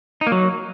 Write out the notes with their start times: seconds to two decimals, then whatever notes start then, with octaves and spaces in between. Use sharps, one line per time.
0.21 D#4
0.27 A#3
0.32 F#3